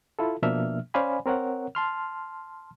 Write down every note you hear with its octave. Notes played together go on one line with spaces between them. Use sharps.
E4 F4 A4
B2 F3 A#3 D4 E5 F6
C#4 C5 D5 F5 G#5 B5
C4 A#4 C#5 F#5
A5 C6 F6